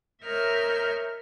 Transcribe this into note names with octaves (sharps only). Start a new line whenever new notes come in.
A#4 C#5 D#5 E5 F6 G6